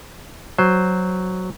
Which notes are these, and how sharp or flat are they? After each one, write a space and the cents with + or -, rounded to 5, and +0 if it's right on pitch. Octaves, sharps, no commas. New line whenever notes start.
F#3 +0 C5 +0